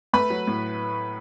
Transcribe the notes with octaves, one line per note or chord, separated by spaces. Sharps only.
A3 B4 B5
F#3
A2